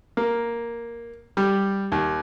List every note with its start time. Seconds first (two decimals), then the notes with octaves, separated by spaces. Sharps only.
0.17 A#3
1.37 G3
1.92 D#2